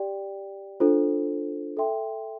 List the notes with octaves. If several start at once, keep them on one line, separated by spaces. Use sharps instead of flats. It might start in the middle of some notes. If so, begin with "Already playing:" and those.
Already playing: G4 D5 G5
D4 F4 A4 C5
A4 E5 G5 C6